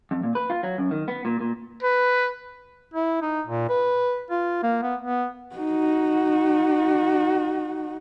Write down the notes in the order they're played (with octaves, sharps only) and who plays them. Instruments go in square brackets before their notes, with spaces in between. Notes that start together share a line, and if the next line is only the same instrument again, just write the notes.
[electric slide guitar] F2
A#2
B4
F4
F#3
F#2
D#3
B3
A#2
A#2
[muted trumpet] B4
[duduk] E4
D#4
A#2
B4
F4
A#3
B3
B3
[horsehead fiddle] D#4 F#4